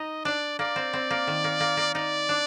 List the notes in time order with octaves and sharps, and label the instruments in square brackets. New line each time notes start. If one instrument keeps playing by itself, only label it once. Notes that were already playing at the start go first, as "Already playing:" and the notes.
Already playing: [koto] D#4 [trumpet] D#5
[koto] D4 [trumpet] D5
[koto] A#3 [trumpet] D5
[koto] C4
C4
A#3
D#3
A#3
A#3
A#3
[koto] D#4 [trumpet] D5
[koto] D4